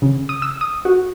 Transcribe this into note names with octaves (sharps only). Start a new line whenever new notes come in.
C#3
D#6
E6
D#6
F#4